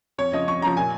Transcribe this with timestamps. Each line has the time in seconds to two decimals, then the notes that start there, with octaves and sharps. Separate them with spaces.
0.18 F2 C#5
0.32 C#3 F3 D#5
0.48 F2 C#6
0.62 C#3 F3 A#5
0.77 A#2 G#5